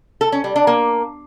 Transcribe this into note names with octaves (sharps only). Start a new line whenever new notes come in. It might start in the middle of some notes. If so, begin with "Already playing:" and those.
A4
C#4
G3
D4
A#3